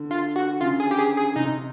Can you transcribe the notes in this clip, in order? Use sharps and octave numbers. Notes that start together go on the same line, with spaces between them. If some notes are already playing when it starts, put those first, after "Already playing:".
Already playing: D3
F4
F#4
C#3 F4
G#4
G4
G#4
G#4
C3 D#4